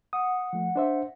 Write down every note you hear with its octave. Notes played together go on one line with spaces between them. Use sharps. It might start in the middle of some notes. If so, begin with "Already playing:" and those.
F#5 D#6
F3 A3
D4 C5 E5